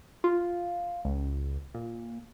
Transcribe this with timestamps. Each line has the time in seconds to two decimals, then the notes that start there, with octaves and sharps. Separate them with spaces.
0.24 F4
1.05 C#2
1.74 A#2